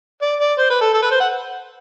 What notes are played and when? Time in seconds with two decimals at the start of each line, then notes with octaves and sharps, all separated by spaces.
0.22 D5
0.40 D5
0.58 C5
0.70 B4
0.81 A4
0.94 A4
1.02 B4
1.11 C5
1.20 F#5